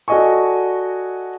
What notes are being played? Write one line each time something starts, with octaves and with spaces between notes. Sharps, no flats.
F#4 A4 D5 D#5 G#5 C#6